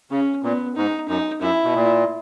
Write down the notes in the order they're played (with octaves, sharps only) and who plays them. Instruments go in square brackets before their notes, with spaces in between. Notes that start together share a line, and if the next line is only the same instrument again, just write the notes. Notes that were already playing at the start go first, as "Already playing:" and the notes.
[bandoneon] C#3 [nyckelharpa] C#4
[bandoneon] A#2 [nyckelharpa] B3
[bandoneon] G#2 [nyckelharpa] D#4
[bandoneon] F#2 [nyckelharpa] D#4
[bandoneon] F#2 [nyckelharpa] E4
[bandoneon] B2
A#2